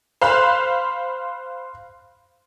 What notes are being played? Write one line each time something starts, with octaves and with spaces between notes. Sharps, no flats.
C5 F5 B5 C6 F6 F#6